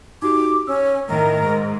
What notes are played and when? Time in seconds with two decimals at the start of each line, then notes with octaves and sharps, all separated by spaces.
0.22 D#4 F#4 G4 D6
0.67 C#4 E6
1.09 A2 D#3 A#4
1.43 G#2